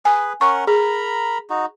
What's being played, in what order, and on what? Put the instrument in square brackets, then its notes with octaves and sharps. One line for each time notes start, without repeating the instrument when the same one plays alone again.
[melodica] G#4 B4 [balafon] G#5
[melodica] C#4 A#4 F#5 [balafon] C#6
[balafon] G#4 [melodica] A#4 A#5 B5
[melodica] D#4 F#4